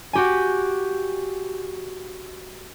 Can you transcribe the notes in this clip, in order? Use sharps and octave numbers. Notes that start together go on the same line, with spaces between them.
F#4 G4 G#5